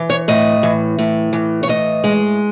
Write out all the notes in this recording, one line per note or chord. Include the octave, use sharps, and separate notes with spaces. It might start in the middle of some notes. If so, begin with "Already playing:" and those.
Already playing: E3
C#5
A2 D#5
E3
A2
E3
C#5
A2 D#5
G#3